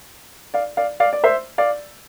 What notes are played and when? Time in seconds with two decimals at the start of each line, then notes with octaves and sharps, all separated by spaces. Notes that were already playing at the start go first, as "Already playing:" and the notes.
0.54 D5 F5
0.77 D5 F5
1.00 D5 F5
1.13 D5
1.24 C5 E5
1.58 D5 F5